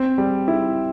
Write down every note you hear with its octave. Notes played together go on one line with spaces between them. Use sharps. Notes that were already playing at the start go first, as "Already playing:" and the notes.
Already playing: C4
G3
E4